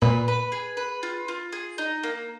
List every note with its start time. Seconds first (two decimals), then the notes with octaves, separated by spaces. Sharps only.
0.02 A#2 B4
0.28 B4
0.52 G#4
0.77 B4
1.03 F4
1.28 F4
1.52 G#4
1.78 D#4
2.03 A#3